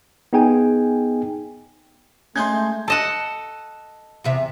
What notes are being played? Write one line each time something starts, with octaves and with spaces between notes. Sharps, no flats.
B3 D#4 G#4 G5 G#5
G#3 A3 C#4 D#4 G#5 C6 G6 G#6
A4 D#5 F#5 A5 E7
E2 C3 E5